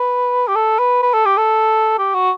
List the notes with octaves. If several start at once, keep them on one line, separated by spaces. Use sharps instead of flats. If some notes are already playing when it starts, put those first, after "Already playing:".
Already playing: B4
G4
A4
B4
B4
A4
G4
A4
G4
F#4